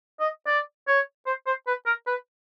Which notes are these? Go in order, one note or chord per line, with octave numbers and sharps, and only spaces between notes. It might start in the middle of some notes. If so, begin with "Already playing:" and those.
D#5
D5
C#5
C5
C5
B4
A#4
B4